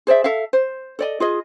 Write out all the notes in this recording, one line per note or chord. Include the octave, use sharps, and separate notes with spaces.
G#4 C5 D5 E5
A4 E5 F5
C5
A4 D5 D#5
F4 G#4 D#5